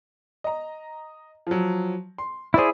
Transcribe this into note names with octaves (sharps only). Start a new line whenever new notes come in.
D#5 A#5
F3 F#3
C6
E4 G#4 C5 D5 E5